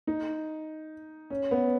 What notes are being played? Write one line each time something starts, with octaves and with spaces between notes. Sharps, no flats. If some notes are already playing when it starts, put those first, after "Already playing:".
D#4
C#4
B3